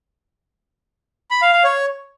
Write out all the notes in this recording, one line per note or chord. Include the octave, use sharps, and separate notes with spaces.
B5
F5
F5
C#5